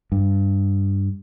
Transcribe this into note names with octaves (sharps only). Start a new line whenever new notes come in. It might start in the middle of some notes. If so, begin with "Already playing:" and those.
G2